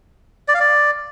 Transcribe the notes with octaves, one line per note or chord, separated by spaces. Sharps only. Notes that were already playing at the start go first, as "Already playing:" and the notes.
D5
F5
D5